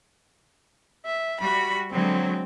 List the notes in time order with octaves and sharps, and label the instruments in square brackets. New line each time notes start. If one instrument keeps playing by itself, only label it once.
[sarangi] E5
[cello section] G3 F#4 [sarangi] B5
[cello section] D3 F#3 G#3 [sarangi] C4